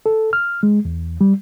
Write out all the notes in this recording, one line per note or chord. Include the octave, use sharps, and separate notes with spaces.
A4
F6
G#3
E2
G3